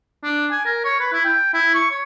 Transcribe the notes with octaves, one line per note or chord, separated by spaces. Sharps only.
D4
G#5
A#4
C#5
B4
E4
G5
E4
C#6
C#5